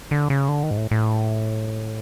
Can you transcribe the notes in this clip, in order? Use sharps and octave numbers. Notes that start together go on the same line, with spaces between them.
D3
C#3
D3
D#3
G#2
A2
A2